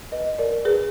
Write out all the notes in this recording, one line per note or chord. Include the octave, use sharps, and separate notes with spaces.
B4 D#5
A#4 D5
G#4 B4